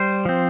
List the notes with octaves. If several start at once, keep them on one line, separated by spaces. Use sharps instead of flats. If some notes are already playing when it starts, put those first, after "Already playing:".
Already playing: G3 C5
F3 C4